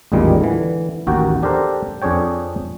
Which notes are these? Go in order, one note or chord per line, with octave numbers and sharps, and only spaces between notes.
A1 E2 A#2 D#3 G3 G#3
D3 E3
A1 D#2 F#4 A#4 G5
D4 G4 A4 A#4 C5
F2 D4 G#4 C#5 G5